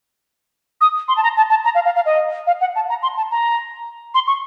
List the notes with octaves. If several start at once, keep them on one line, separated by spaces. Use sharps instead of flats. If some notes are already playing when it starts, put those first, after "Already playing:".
D#6
C6
A5
A#5
A5
A5
A#5
F5
F5
F5
D#5
F5
F#5
A5
A#5
C6
A5
A#5
C6
C#6